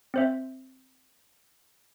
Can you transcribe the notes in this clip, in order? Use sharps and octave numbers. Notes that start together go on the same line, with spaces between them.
C4 C5 E5